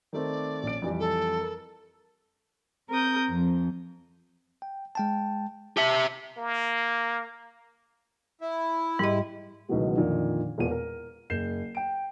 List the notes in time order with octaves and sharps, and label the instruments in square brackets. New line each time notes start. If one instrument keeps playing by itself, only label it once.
[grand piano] D#3 A3 C4 [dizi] D5
[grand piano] A#1 C#4 D7
F2 E3 G3
[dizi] A4
[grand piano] A#4
[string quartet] C4 A#4 D#6 G6
F2
[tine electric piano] G5
G#3 G5 A5
[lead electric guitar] G4 E5 [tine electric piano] A5
[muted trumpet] A#3
[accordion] E4
[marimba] G#2 D#5 [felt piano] G3
[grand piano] C#2 B2 D#3 E3 F#3 A3
F2 A#2 D3 D#3
E1 E2 A#2 D#7
A#4
F#1 G6 C7 E7
G5 D7